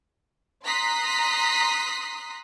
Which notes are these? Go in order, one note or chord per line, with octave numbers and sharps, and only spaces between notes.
A#5 C6 D#6 F#6 B6 C7